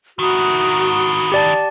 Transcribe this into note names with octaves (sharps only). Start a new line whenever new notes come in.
D#3 E4 F#4 A#5 D#6
G4 D5 A5